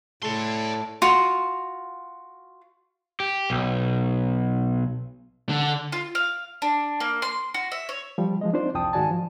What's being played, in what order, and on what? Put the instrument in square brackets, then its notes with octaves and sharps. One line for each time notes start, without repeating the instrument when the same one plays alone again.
[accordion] A2 [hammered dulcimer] A3 [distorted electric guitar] D5 C6
[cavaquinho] F4 F#4
[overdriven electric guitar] G4
B1
[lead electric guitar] D3
[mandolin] F4
F5
D4
A#3
C6
F#4
E5
C#5
[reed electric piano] F3 G3
F3 G#3 D#5
C4 D4 D#4 F4 C5 D5
C2 F2 G5 A5 D#6
G#2 D#3 F#4 D5 G#5 A5
F3